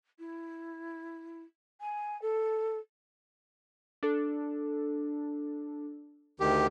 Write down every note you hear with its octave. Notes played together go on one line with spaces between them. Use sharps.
E4
G#5
A4
D4 A4
D2 D#3 G4